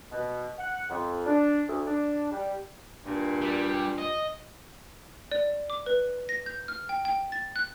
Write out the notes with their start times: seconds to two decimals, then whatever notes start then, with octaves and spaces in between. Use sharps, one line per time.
0.11 B2
0.58 F#5
0.90 F2
1.25 D4
1.67 D2
1.86 D4
2.32 G3
3.05 G2 A#2
3.42 G3
3.98 D#5
5.32 D5
5.70 D6
5.86 B4
6.29 A#6
6.46 G6
6.68 F6
6.89 G5
7.05 G5
7.32 A6
7.56 F#6